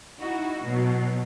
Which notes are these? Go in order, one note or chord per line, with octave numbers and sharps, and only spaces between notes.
D#4 E4 F#4
B2 F#3